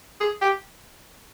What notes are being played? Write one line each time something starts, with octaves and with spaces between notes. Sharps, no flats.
G#4
G4